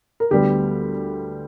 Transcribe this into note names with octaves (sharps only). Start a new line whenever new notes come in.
A#4
D2 D3 G3 B3 G4